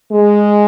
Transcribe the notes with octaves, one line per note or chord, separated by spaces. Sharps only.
G#3